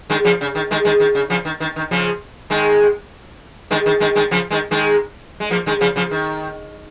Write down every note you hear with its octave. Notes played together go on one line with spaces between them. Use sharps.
D#3 G#3
C#3 F3
C#3
D#3
D#3 G#3
D#3 G#3
D#3
C#3
C#3 F3
D#3
D#3
D#3
C#3 F3
D#3 G#3
D#3 G#3
D#3
D#3 G#3
D#3 G#3
C#3 F3
D#3 G#3
D#3 G#3
G#3
F3 A#3
D#3 G#3
C#3 F3
C#3 F3
D#3